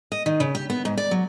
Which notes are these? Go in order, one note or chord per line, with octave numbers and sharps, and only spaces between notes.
D#5
D#3
C#3
G4
B3
G#2
D5
F#3